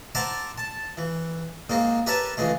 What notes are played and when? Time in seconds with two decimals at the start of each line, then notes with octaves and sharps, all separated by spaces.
0.15 C5 E5 F#5 A5 A#5 D6
0.58 A5
0.97 E3
1.70 G#2 A#3 C4 D#4
2.06 G4 A#4 B4 C#5 E5 A5
2.37 C#2 E3 G#3 A3